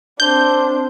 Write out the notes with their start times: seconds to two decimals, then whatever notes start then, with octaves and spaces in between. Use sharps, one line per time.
0.20 C4 D4 C5 G6